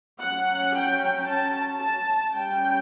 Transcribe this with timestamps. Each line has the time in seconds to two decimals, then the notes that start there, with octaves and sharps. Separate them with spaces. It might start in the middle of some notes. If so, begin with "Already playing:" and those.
0.21 F#3 C#4 F#5
0.75 G5
1.27 A5
1.81 A5
2.33 G3 C#4 G5